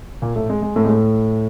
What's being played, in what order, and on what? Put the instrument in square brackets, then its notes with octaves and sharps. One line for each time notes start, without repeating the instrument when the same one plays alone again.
[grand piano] A#2 A#3
A2 A3
G#3
G#3
A2 A3
G#3
A2 A3